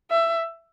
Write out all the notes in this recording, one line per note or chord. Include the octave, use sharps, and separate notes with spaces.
E5